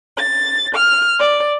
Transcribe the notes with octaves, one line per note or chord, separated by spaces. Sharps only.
A6
F6
D5